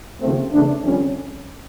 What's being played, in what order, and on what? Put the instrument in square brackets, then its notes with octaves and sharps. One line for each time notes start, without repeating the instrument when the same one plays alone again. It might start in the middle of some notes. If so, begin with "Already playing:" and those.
[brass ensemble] D#2 C#3 F3 A3 C4
E2 C#3 E3 A3 D4
F2 D3 G3 C#4